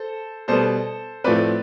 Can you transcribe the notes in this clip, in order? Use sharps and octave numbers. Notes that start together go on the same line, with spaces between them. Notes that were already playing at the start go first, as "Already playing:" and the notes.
Already playing: A4 C5
B2 G3 B3 A4 C5
A2 F3 A3 C4 B4 D5